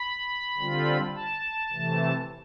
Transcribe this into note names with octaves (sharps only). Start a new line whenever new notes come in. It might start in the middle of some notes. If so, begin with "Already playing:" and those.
Already playing: B5
D3 G3 C4 F4
A5
C3 E3 A3